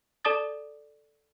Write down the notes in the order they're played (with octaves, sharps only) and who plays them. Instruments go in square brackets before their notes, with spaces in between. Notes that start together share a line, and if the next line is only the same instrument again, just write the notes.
[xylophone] A4 D5 A5 D6 D#6 A6